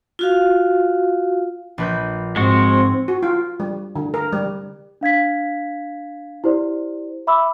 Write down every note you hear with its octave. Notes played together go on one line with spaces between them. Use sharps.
F4 F#4 F5
A#1 B4 G6
G#2 G#3 C4 F#4
F#4
F4
G3
D3
A#4
G3
D4 F5 G#6 B6
E4 G4 C5 D5
E5 B5 D6 E6